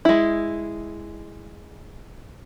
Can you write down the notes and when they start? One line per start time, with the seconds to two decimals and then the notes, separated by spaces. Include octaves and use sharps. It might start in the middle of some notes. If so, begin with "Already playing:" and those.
0.05 G#3 E4